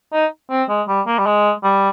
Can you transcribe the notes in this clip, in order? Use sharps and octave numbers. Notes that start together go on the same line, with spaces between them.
D#4
C4
G#3
G3
A#3
G3
G#3
G3